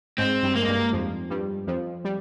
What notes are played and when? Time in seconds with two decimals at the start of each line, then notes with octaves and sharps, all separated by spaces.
0.18 G#2 G#3 C4
0.43 G2 G3
0.55 A#3
0.62 G#3
0.68 G2 G3
0.93 F2 F3
1.30 G2 G3
1.67 F2 F3
2.05 G3